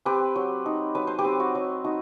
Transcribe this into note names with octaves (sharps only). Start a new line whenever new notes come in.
C4 G4 B4
F#3
D#4
F#3 B4
C5
G4 B4
C4
F#4
F#3
D#4 F#4